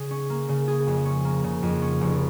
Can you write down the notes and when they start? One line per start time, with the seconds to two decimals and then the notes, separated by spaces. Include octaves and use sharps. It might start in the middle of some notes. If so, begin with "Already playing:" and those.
Already playing: C#3 G#4
0.11 C#4
0.30 A#3
0.49 C#3
0.68 G#4
0.87 F2
1.06 C#4
1.25 A#3
1.44 C#3
1.63 F2
1.82 C#4
2.01 F1